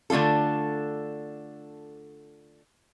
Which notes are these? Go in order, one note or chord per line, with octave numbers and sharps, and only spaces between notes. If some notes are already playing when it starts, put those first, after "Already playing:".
D3 A3 D4 F4 A4